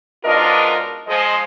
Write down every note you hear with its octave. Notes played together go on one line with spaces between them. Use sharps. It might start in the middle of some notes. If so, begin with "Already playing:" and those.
G#2 B2 D4 F4 A#4 D#5
F3 G#3 G#4 C5 D#5